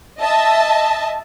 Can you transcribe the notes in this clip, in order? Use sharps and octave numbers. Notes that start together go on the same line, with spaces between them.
D#5 E5 A5